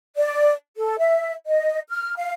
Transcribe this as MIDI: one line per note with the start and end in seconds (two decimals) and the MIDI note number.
0.17 0.54 74
0.77 0.95 69
0.99 1.32 76
1.46 1.80 75
1.89 2.14 89
2.16 2.32 77